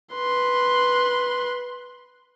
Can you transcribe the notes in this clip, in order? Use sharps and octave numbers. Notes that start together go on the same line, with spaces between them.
B4 C6